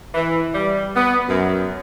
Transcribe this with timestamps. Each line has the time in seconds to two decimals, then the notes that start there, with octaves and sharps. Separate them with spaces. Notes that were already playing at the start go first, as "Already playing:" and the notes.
0.14 E3
0.54 G3
0.95 B3
1.28 F#2